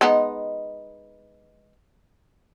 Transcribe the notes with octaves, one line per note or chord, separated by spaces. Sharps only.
G#3 B3 D#4